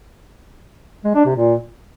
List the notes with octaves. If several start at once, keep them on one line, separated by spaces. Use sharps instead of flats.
G#3
D4
C3
A#2